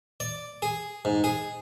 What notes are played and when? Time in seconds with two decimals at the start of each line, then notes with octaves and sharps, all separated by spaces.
0.20 D5
0.62 G#4
1.05 G#2
1.24 G#4